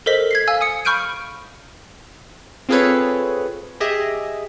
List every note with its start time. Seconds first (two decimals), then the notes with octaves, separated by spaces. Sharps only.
0.06 A4 A#4 C5 D#5 B6
0.31 G#6 B6 C7
0.48 F5 G#5 E6
0.61 G#5 D#6 C#7
0.85 B5 C#6 F6 G6 D7 D#7
2.69 C4 F4 G#4 A4 B4 C#5
3.80 G4 G#4 D#5 E5